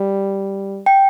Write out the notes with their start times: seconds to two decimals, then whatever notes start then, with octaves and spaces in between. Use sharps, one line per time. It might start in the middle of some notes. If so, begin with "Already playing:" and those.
Already playing: G3
0.86 G5